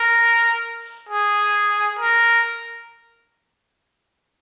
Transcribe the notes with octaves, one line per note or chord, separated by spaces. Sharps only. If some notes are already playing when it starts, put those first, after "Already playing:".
Already playing: A#4
G#4
A#4